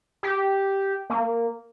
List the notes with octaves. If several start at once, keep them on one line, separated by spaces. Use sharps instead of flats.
G4
A#3